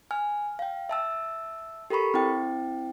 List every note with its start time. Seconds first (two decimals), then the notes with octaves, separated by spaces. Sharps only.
0.11 G#5 F6
0.59 F5 G5
0.89 E5 A5 E6
1.90 G4 A4 A#4 B5 C#6
2.14 C4 E4 G5